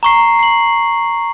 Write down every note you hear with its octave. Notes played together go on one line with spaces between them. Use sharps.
A#5 C#6 C7
C7 F#7